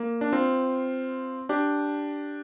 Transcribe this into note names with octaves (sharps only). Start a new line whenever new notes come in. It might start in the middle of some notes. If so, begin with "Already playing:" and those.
Already playing: A#3
D4
C4 F4
D4 G4